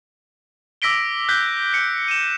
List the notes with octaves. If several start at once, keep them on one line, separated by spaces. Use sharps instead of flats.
D6 E6 A#6 B6 D7 G7
F#6 G6 B6 G7
C#7
D#7 E7